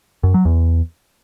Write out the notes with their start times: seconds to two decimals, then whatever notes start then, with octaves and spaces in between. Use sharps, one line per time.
0.23 F#2
0.34 F#3
0.45 E2